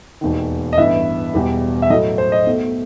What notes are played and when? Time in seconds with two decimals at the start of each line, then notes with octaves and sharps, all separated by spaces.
0.21 E1 D#2 D#3
0.73 D#5
0.77 A1 G2 E3 B3 E4 E5
1.34 E1 E2 B2 G3
1.82 E5
1.90 A2 F#3 A3 E4 D#5
2.18 C5
2.32 D#5
2.47 B1 B2 A3